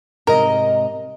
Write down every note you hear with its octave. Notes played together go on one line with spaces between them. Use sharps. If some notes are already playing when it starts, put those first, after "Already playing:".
G#2 C3 A#4 D#5